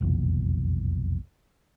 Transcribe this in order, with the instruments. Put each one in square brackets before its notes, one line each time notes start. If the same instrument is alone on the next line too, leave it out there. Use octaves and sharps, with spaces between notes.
[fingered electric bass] F1 B1 E2 A#2